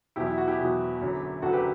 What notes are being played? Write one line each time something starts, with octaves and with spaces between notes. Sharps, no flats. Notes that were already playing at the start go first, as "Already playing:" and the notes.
E2 B2 F#3 E4 G4
E4
F#4
E4 G4
E2 B2 F#3
F#1 F#2 D3 F#3
F#1 F#2 D3 F#3 F#4 A4
G4 B4